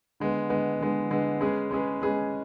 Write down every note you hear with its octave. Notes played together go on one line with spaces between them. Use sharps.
D3 G#3 B3
D3 G#3 B3
D3 G#3 B3
D3 G#3 B3
G#3 C#4 G#4 B4
G#3 C#4 G#4 B4
G#3 C#4 G#4 B4